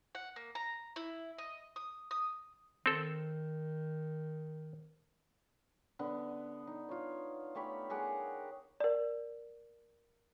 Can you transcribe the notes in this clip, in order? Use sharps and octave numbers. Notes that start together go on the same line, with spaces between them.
F#5
A#3
A#5
E4
D#5
D#6
D#6
D#3 C4 A4
D3 B3
D#4
F4 C#5
A3 G4 C#5 B5
G4 G#4 A#4 F#5
A#4 D5